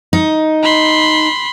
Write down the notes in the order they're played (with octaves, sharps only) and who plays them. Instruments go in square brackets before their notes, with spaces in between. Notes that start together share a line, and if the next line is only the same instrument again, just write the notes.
[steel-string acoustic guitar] D#4
[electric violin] B5 C6